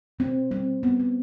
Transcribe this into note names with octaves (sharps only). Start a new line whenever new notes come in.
B2 C4
G3 C4
G3 B3
C4